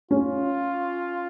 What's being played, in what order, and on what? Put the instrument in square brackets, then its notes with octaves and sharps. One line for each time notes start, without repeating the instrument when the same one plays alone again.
[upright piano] C#4 [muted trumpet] F4